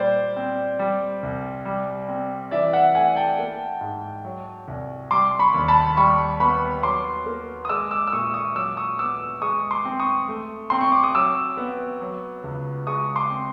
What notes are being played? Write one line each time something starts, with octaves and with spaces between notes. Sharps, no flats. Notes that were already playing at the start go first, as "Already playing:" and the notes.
Already playing: A#2 G3 C5 D5
C4
G3
C2
G3
C4
E3 D5 E5
E5 F#5
A3 F#5 G#5
G5 A5
A#3
G#2
F#3
C2
G3 C6 D6
B5 C#6
D#2
A5 B5
G3 B5 C#6
B3 B5 C#6
F#3 C6 D6
A#3
D#6
G#3 D6 E6
D6 E6
E6
A#2 C#6 D#6
C#6 D#6
F#3 D6 E6
C#6 D#6
B3 D6 E6
G#3 C#6 D#6
C6 D6
C4
C#6 D#6
A3
C4 C6
C#6
D6
D#6
F#3 D6 E6
B3
F#3
C#2
G#3 C#6 D#6
C6 D6
C4